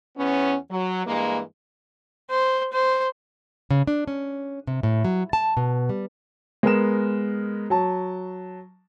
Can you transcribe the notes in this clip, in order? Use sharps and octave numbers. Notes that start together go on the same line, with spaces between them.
E2 B3 C#4
F#3
G2 E3 G#3 A#3
C5
C5
C#3
D4
C#4
C3
A2
F#3
A5
B2
G3
G#3 B3 A#4 E7
F#3 A5